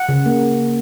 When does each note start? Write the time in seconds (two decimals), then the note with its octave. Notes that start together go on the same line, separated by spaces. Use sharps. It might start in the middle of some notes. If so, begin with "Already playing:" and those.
Already playing: F#5
0.09 C#3
0.26 A#3